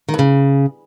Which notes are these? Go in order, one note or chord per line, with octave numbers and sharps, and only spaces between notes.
D#3
G2
C#3